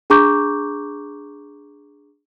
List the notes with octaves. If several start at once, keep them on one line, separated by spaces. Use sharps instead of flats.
D4 G#4 A#5 C#6 D6 G6